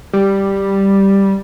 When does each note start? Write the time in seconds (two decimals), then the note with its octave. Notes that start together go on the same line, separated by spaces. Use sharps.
0.13 G3